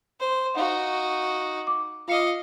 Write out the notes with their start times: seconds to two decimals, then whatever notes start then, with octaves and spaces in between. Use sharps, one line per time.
0.20 C5
0.55 D#4 F#4 F5 F#5
1.67 D6
2.08 F4 D#5 F5 C#7